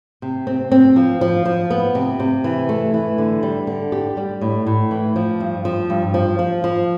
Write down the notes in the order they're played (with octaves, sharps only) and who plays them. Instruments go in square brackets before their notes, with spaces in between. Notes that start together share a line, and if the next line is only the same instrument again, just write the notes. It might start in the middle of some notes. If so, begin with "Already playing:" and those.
[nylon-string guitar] C3
C4
C4
F3
F3
F3
B3
C3
C3
E3
A3
E3
D3
G3
D3
G4
G3
A2
A2
E3
F3
G2
F3
G2
F3
F3
F3